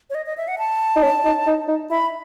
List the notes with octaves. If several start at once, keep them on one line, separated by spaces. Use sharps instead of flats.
C#5
D#5
D#5
E5
F#5
A5
D#4
C#4
D#4
D#4
D#4
E4 B5